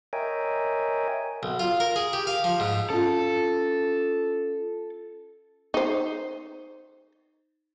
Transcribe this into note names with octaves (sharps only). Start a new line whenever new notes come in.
A#4 C#5 D#5 E5 G5 G#5
B1
F4
A#4
G#4
G4
F5
F3
G#2
C#4 F4 A4
D#4 C5